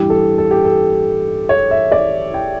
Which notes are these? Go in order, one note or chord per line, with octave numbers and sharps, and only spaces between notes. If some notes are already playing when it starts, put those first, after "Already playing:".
Already playing: A1 G2 E3 G4
A4
A4
G4
A4
C#5
E5
D5
G5